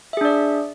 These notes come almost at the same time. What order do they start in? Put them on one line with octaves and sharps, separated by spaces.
E5 G#4 D4 D5